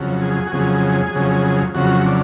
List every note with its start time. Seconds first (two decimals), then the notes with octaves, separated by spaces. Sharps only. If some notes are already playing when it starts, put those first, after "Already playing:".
Already playing: F2 C#3 F#3
0.21 G#4
0.47 F#4
0.52 F2 C#3 F#3 G#4
1.13 F2 C#3 F#3
1.75 F2 C#3 F#3 F#4
2.06 D4